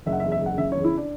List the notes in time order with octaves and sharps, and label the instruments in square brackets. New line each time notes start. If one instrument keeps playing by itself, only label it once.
[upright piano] F#1 E5
F#5
E5
E2
E5
F#1
F#5
C#3 E5
E2 C#5
E4
D4